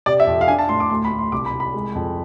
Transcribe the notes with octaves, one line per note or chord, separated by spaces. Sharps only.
C3 D5
E5
F2
F5
D4 G#5
A5
A2 C6
D6
D2 C6
B5
D2
C6
C2 D6
B5
C2
B5
G#3
F2